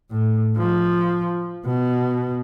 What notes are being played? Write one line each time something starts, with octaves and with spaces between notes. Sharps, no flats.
A2
F3
B2